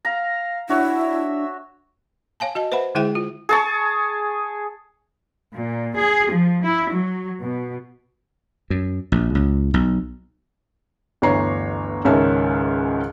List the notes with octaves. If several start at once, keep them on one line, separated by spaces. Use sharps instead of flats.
F5 A#5
D4 E4 F#4 C#5 E5
C#5 F5 G#5 A5
F#4 D#5 A5
B4 C5 E5 F#5 B5
D3 G#3 E4 G#4 E5 G5
F4
G#4 A5 C#6
A#2
G#4
F3
E4
F#3
B2
F#2
A#1
C#2
B1
G1 D2 E3 C#5 A#5 C7
C#2 G#2 D#3 C#4 E5 A5